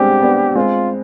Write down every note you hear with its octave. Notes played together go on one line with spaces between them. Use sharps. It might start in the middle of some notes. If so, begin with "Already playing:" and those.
Already playing: G3 G#3 B3 C4 D4 G4
B3 D4
G#3 C4 F4